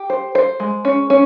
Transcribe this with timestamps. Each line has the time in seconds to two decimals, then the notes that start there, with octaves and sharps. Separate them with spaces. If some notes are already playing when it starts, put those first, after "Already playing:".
Already playing: G4
0.10 C5
0.35 C5
0.60 G#3
0.85 C#4
1.10 C#4